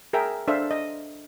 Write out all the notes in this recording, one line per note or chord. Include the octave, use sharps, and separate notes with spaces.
G#4 A#4 E5 G5
D4 A4 C5 E5 F5
D#5